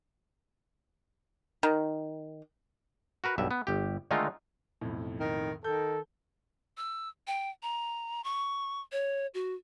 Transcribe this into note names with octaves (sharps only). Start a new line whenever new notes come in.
D#3
F#4 A#4 B4
B1 G2 E5
B3
G1 G4
D3 D#3 G#3 A3 D#4 F4
B1 F2 A2
D#3
D#3 A4 G6
E6
G5
A#5
C#6
C#5
F#4